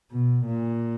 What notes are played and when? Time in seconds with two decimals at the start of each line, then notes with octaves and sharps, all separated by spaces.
0.11 B2
0.45 A#2